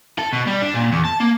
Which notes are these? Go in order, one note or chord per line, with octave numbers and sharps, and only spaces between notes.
A4
B2
G3
D4
A#2
E2
A5
A#3